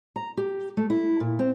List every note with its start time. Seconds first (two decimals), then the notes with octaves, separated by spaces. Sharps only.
0.16 A#5
0.37 G4
0.77 A3
0.90 E4
1.20 A#2
1.39 C4